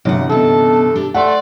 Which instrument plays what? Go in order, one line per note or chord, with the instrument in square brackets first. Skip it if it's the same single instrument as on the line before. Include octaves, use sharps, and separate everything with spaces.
[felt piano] G1 C2 E3 [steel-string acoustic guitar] F#3 F#5
[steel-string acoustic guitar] B2 C#4 [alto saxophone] A4 [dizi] A5
[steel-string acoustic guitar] D4 [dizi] G4
[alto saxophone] A3 [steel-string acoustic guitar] C5 [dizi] D5 [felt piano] F#5 C6